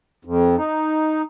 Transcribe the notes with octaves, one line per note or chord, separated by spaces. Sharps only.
F2
D#4